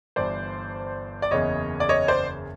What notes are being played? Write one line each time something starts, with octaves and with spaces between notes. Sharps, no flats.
G1 G2 E3 C5 D5
D5
F#1 E2 C#3 E3 C#5 D#5
D5
C#5 D#5
C5 D5